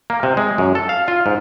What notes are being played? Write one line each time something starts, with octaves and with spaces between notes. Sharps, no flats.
A#3
C3
G#3
F#2
A4
F5
F4
G#2